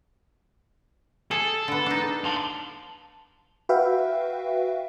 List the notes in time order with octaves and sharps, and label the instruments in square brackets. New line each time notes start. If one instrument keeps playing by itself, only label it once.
[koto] G#4 [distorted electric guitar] A4
[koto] D3 B3
D4 D#4
[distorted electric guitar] A5 C6
[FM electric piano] F#4 B4 E5 F5 G5